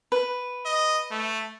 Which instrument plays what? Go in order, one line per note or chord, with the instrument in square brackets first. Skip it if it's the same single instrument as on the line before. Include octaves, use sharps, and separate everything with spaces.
[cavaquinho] B4
[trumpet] D#5
A3